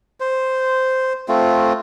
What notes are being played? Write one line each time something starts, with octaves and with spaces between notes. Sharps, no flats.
C5
A3 C4 F4